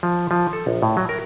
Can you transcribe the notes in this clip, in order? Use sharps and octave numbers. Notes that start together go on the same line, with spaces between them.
F3
F3
A4
A#1
A2
F#3
A#4